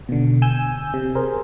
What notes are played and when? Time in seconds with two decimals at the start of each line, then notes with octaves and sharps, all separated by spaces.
0.09 B2 D3
0.42 G#5 E6 G6
0.94 C3
1.15 G#4 A#4 C5